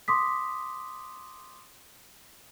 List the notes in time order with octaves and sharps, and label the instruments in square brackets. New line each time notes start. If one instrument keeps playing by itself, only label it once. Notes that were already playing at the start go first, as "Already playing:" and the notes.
[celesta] C6 D6 D#6 B6